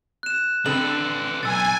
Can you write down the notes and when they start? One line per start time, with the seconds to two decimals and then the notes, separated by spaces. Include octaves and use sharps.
0.23 F#6 E7
0.66 D3 A3 C4 A4 B4 F#7
1.43 B1 G#5 E6 A6